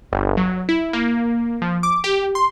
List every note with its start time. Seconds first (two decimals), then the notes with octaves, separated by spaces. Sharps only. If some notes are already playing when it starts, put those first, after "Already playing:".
0.12 G1
0.37 F#3
0.69 E4
0.93 A#3
1.62 F3
1.83 D6
2.04 G4
2.35 C6